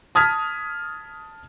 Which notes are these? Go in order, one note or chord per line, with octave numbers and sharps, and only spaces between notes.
A5 D#6 F6 G#6 B6